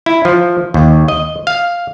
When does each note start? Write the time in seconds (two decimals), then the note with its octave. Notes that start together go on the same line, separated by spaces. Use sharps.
0.06 E4
0.25 F3
0.74 D#2
1.08 D#5
1.47 F5